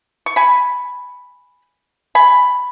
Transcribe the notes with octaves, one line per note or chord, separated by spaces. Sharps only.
C#6
G#5 B5
G#5 B5